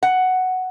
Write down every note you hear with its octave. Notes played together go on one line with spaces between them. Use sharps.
F#5